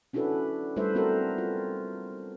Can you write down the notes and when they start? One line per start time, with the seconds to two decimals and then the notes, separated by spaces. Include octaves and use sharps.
0.13 C#4 D4 E4 F#4 A4 B4
0.76 G3 A3 E4 B4 C5 E5
0.95 B3 C4 F#4 A4 A#4 C5
1.38 F4